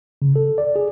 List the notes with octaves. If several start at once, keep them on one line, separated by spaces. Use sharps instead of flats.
C#3
A4
D5
G#4